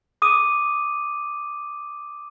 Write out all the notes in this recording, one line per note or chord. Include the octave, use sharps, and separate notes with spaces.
D6 D#6 D#7